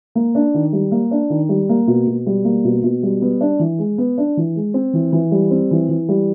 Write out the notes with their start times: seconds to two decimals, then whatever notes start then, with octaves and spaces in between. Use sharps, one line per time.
0.15 A#3
0.35 D4
0.54 D#3
0.73 G3
0.92 A#3
1.11 D4
1.30 D#3
1.49 G3
1.69 A#3
1.87 B2
2.07 B2
2.26 G3
2.45 A#3
2.64 B2
2.83 B2
3.03 G3
3.22 B3
3.41 D4
3.59 E3
3.79 G#3
3.98 B3
4.18 D4
4.37 E3
4.56 G#3
4.74 C4
4.93 E3
5.12 E3
5.31 G3
5.51 C4
5.71 E3
5.89 E3
6.09 G3